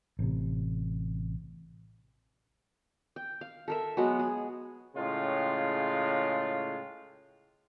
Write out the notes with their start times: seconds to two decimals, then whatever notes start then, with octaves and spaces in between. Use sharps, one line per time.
0.19 A1 C3
3.16 G5
3.41 F5
3.68 A4 A#4 E5
3.97 F#3 G#3 B3 F#4
4.20 G#4
4.96 A2 C#3 G#3 F4